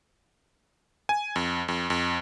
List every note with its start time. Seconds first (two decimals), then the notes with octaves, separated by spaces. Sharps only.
1.09 G#5
1.36 F2
1.68 F2
1.90 F2